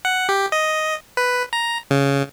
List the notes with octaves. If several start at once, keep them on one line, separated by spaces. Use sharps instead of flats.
F#5
G4
D#5
B4
A#5
C#3